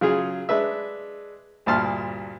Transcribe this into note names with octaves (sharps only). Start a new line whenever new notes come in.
C#3 F#3 F4 G#4
G#3 D4 B4 E5
D2 G2 A#2 A5 C6 F6